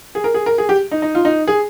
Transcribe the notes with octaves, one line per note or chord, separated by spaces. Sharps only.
G#4
A#4
G#4
A#4
G#4
G4
D#4
D#4
F4
D#4
G#4